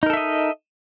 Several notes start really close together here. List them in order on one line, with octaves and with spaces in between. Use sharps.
D#4 A#4 A4 E5 D#5